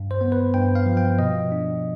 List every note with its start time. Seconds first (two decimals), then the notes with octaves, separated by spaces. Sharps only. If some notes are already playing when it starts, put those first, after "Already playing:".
Already playing: G2
0.11 C5
0.21 B3
0.32 B4
0.54 G2 G5
0.75 F5
0.86 F3
0.97 G5
1.19 B2 D#5
1.52 D4